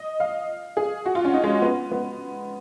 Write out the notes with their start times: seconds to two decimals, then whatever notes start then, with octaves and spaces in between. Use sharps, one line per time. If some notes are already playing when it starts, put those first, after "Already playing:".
Already playing: D#5
0.20 F5
0.77 G#4
1.06 F#4
1.15 F4
1.25 C#4
1.34 D#4
1.44 G#3
1.62 B3
1.92 B3